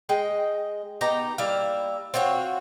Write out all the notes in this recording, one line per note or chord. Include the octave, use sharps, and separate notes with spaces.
G#3 D#5 G5
B3 D#4 G4 A#5
G3 A#3 E4 F5
C4 F4 F#4 C#5